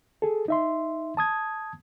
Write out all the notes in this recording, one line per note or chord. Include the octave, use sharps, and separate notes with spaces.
G#4 A4
D#4 E5 C6
A5 D#6 G#6